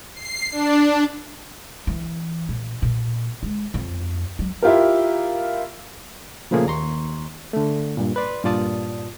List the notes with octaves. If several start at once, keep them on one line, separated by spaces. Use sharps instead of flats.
C7
D4
E3
A#2
A#2
G#3
F2
F#3
E4 F4 G4 A#4
A#2 C#3 F3 A3 A#3 G#4
D#2 A#5 C6 C#6
D3 A3
G2 A#2
B4 D5 C6
G2 A#2 F4 D5 A5 D#6